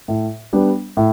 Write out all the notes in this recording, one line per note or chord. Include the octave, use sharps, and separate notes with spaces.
A2
G3 B3 D4
A2